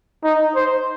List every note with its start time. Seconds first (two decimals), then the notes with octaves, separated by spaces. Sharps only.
0.24 D#4
0.55 C5